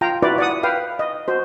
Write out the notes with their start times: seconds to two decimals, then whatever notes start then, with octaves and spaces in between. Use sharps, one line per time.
0.01 F4 F5 G5 A#5
0.22 E4 F#4 B4 D5
0.38 D5 F#5 D#6
0.63 B4 F5 G5
0.99 D#5
1.28 F#4 C5